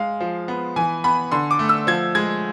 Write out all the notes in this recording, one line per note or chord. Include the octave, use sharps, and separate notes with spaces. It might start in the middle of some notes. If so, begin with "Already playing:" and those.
Already playing: G#3 F5
F3
B3
E3 G#5
B3 B5
D3 C6
D6
A3
E6
F3 G#6
G#3 G#6